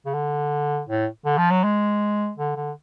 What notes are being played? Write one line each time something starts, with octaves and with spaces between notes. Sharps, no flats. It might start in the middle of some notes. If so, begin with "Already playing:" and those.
C#3
D3
A2
D3
F3
F#3
G#3
D3
D3